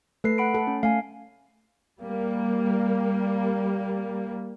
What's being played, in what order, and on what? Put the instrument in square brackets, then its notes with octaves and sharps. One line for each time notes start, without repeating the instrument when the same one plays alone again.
[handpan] A3 [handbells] A4 B4 C7
[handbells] F#5 B5 D7
[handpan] A4
[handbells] C#4
[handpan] A3 [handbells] F5 G#5
[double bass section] G3 A#3